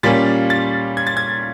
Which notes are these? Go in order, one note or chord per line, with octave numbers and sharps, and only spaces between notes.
A#2 G3 A#3 C#4 F4 A6
A6
G#6
A6
G#6